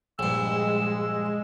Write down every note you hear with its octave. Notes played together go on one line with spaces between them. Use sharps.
A#1 G2 G#3 E6